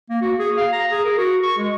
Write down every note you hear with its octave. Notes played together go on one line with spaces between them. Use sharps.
A#3
F#4
G#4
F5
A#5
G#4
A#4
F#4
C#6
G#3